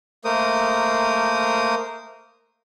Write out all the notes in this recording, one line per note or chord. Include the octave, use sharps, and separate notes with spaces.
A3 A#3 A#4 C5 D#6